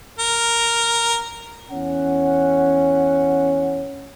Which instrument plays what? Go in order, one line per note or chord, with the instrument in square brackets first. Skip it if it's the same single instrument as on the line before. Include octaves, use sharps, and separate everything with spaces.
[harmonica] A#4
[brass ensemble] E2 C#4 F#5